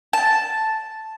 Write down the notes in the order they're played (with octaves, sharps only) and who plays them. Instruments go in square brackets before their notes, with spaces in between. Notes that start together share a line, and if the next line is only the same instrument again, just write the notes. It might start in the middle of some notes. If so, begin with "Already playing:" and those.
[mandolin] A5